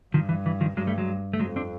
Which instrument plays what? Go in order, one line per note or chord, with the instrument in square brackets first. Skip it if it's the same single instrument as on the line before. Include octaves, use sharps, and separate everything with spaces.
[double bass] G2 [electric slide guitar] D#3 F3
[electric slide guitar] E3
E3
D#3 F3
[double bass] G2 [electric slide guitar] F#3 G#3
[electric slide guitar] G3 A3
F#3 G#3
A3
[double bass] F2 [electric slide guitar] F#3 G#3
[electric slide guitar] C4 D4